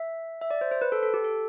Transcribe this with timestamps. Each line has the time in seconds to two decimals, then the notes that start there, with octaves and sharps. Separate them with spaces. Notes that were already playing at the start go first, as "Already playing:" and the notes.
Already playing: E5
0.41 E5
0.51 D5
0.61 C5
0.72 C5
0.81 B4
0.92 A4
1.03 A4
1.14 G4
1.24 A4